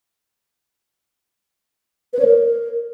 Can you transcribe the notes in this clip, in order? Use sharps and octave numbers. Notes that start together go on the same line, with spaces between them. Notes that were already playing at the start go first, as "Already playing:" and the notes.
B4
C#5
A#4